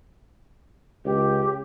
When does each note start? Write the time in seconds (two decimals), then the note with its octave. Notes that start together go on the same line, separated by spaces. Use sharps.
1.05 C#2 G4